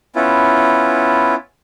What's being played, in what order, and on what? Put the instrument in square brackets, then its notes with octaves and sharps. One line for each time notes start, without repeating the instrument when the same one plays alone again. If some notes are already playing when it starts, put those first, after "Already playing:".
[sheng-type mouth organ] B3 C#4 E4 F4